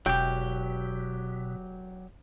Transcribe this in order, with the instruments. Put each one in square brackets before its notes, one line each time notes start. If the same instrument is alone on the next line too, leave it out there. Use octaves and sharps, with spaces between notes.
[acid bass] E1 [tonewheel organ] B2 [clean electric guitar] F#3 G4 [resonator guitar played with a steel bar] G5